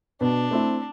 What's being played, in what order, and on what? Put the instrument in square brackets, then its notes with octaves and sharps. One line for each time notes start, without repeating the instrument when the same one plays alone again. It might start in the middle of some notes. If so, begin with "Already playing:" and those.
[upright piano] B2 [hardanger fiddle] D4
[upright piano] A3 C4 E4